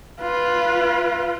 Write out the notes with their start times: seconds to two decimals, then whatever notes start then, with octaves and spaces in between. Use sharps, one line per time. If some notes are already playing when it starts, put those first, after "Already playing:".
0.21 F4 B4